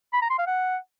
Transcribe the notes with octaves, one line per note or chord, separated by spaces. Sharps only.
B5
A#5
C6
F5
F#5